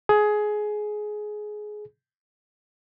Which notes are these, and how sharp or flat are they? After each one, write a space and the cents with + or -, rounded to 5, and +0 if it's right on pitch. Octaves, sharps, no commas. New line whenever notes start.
G#4 +20